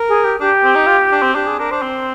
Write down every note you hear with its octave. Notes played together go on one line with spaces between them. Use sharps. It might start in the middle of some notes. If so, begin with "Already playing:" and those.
Already playing: A#4
G#4
G4
D4 G4
C4
D#4
F4
D4
C4
D4 G4
G#4
D4 A#4
D4 C5
C4